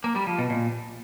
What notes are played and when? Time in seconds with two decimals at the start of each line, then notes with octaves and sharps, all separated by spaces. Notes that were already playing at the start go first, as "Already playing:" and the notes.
0.04 A#3
0.16 G3
0.27 F3
0.39 B2
0.50 A#2